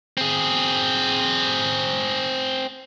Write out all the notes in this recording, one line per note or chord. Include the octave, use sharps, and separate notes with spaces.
C4 G#4